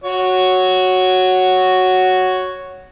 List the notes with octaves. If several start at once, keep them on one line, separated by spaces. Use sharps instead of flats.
F#4 C#5